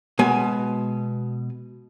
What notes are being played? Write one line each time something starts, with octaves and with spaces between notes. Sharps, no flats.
B2 G#3 G#5